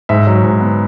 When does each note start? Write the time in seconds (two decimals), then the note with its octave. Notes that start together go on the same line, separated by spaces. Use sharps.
0.09 G#2 E5
0.27 F#3
0.44 G#2
0.61 B3